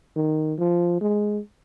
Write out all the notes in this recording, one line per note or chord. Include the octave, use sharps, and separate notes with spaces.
D#3
F3
G#3